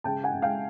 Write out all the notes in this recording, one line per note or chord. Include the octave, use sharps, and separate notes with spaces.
C#3 G5 A5
F#5 G#5
C#3
F5 G5